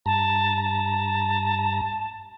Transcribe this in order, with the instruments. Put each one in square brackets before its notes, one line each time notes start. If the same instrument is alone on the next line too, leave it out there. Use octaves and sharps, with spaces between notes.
[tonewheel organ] G2 A#5 [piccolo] A5
[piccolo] A5